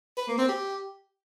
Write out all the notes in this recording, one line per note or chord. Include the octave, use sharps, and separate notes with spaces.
B4
A#3
C4
G4